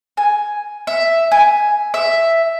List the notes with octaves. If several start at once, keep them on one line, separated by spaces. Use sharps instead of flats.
G#5
E5
G#5
E5